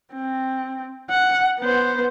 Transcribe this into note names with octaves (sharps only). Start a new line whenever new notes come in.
C4
F#5
B3 C5